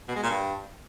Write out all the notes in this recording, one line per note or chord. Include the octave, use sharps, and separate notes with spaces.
B2
G#3
A#2
G2